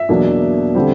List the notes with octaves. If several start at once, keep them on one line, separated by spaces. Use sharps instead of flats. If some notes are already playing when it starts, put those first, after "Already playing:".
Already playing: E5
E2 B2 F#3 A#3 D4
D3 G3 C4